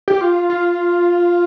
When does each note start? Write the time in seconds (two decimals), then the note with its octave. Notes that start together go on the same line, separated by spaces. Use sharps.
0.08 G4
0.21 F4
0.50 F4